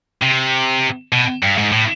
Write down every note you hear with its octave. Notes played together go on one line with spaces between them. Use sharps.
C3
B2
G2
G#2
A2